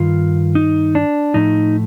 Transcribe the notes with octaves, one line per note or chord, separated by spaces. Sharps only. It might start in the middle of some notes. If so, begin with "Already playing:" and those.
Already playing: G2 D#3 F4
D#4
D4
A2 F3 A3 D#4